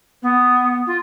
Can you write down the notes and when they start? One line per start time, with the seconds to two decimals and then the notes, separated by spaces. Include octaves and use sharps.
0.22 B3
0.86 F4